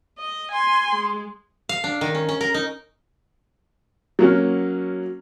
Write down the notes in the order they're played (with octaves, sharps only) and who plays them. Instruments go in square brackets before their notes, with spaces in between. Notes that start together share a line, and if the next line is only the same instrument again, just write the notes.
[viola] D#5
G#5 C6
G#3
[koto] F5
D4
D#3
C#4
C#4
A#4
D#4
[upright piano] F#3 A#3 C#4